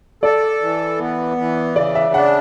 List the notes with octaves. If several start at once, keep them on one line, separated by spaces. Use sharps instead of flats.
A4 D5
E3
B3
E3
C#3 D5
E5
D4 F#5